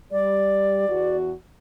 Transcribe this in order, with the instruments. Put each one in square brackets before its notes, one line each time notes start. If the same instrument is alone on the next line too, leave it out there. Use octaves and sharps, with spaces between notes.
[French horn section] G3 [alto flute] D5
[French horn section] E2 F#4